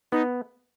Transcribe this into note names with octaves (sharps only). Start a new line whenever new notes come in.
B3 D#4